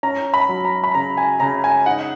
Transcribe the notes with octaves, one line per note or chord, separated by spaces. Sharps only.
C#4 A#5
B5
F#3
A#5
B5
C#3 A#5
G#5
C#3 A#5
G#5
D#4 F#5